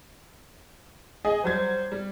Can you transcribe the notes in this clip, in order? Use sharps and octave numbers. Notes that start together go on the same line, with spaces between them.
G#4 D#5 G#5
F#3 G3 C5 G#6
G3